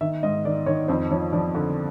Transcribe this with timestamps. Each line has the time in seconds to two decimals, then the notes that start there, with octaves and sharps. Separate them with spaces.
0.01 D#3 E5
0.23 G#2 D#5
0.45 D#3 D5
0.66 D#3 C#5
0.88 F2 C5
1.11 F3 C#5
1.33 F3 D5
1.55 D3